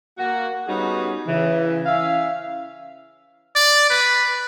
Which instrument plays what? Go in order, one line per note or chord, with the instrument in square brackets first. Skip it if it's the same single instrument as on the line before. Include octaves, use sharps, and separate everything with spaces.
[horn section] A#3 F#4
G3 B3 C#4 D#4 F#4 G#4
C#3 E3
C#4 E4 E5 F5
[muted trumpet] D5
B4